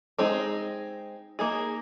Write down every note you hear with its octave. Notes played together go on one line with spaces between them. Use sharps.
G#3 C4 D#4
A#3 D#4 G#4